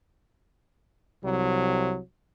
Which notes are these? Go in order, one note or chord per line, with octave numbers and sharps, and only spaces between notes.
C2 C3 F#3